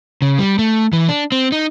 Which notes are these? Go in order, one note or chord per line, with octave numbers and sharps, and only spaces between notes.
C#3
G3
A3
E3
D4
C4
D#4